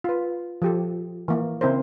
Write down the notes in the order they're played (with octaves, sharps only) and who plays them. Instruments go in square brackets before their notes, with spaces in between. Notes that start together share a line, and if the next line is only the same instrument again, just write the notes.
[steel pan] F4 B4
F3 G4 A4
E3 A#3
C#3 C4 E4 A#4 C5